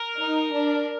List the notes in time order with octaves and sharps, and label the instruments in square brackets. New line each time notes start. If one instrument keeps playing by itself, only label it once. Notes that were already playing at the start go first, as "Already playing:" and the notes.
Already playing: [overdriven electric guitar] A#4
[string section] D#4
D4